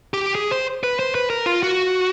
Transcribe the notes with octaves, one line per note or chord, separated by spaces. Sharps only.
G4
G#4
C5
B4
C5
B4
A#4
F4
F#4